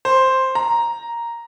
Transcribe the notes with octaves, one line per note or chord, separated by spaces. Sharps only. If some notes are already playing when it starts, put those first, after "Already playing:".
C5
A#5